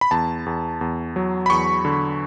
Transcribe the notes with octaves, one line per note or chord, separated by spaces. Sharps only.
B5
E2 A5
E2
E2
F#3
B5
E2 C#6
D3